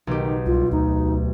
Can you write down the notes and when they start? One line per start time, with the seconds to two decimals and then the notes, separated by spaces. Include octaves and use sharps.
0.07 B1 D#3 G4
0.46 C2 F4
0.72 D2 D#4